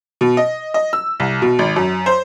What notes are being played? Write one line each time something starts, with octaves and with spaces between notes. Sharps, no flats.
B2
D#5
D#5
E6
C2
B2
G#1
F#2
C5